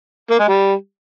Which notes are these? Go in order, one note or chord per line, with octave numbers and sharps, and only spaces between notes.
A#3
G#3
G3